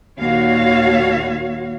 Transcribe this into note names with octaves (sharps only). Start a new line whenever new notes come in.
D#2 A#2 F#4 C#5 F5